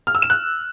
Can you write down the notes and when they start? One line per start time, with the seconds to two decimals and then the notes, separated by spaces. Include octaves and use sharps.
0.07 F6
0.15 E6
0.22 E7
0.30 F#6